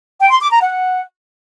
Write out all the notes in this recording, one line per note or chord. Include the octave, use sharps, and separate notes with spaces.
G5
C6
D6
A#5
F#5